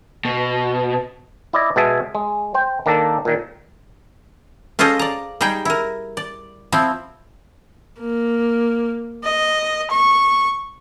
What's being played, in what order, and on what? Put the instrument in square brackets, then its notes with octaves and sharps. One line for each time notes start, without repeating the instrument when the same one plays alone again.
[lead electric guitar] B2
[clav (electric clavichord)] E4 D5 D#5
B2 G#3 G#4 E5 A5
G#3
C5 G5
D#3 A#3 D4 A4
A#2 D#3
[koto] C#4 F4 G#4 A4 C5 D#5
D5 A#5
G3 D#4 G#4 G5
E4 A#4
D5
F3 C4 E4
[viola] A#3
D#5
C#6